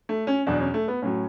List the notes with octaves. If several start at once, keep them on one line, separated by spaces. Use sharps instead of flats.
A3
C#4
E2 B2 F#3 D4
C#4
A3
B3
A2 F#3 C#4